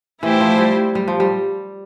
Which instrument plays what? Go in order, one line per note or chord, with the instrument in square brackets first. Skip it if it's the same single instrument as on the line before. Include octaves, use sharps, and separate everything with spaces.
[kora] E3 [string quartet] A3 E4 G4 C5
[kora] F3
G3
G3
F3
G3